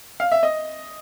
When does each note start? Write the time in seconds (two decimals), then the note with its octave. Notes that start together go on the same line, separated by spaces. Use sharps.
0.20 F5
0.31 E5
0.43 D#5